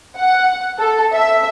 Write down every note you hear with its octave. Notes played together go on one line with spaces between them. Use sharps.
F#5
A4
E5